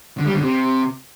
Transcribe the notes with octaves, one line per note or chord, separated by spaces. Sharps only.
D3
G3
D3
C3